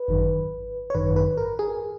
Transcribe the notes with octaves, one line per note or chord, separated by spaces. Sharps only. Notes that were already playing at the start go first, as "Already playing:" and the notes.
Already playing: B4
G#1 F#2 D#3
C#5
G#1 F#2 D#3 B4
B4
A#4
G#4